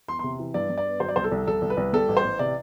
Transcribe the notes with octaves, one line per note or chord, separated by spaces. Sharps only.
E2 C6
C3 C6
E3
G2 D5
G2
D5
B3
F#3 C5
D5
C2 C5
A4
C2
C2 A4
C2
B4
C2
G3 A4
A1
C5
A1
C3 D5